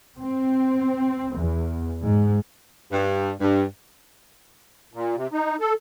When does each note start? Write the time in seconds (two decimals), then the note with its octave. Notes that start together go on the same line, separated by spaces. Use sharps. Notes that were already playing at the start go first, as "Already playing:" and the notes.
0.19 C4
1.34 E2
2.04 G#2
2.92 G2
3.41 G2
4.93 A#2
5.16 C3
5.33 D#4
5.60 A4